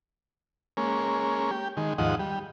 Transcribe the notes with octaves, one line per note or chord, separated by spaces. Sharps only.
G#3 A#3 C#4
G4
D#3 G#3
D#2 G#2 F3 D#5 F#5
G3